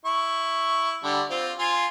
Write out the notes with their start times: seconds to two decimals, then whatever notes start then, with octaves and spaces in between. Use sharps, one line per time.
0.05 E4 C#6
1.04 D3 G3
1.30 C4 F4
1.59 F4 G#5 C6